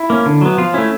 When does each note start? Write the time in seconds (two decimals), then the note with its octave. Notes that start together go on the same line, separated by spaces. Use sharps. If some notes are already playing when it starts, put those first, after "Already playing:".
Already playing: E4
0.10 A#3 C#4
0.26 D3
0.41 F#3 B3
0.58 F3 F4
0.74 A3 C#4 E4